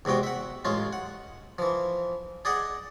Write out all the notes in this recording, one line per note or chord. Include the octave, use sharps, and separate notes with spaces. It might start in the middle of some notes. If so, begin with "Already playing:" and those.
E2 C3 G#3 F#4 G5
E5 F#5
A1 G#3 C#4 F4
F#5
E3 F3
G#4 D5 D#5 F#5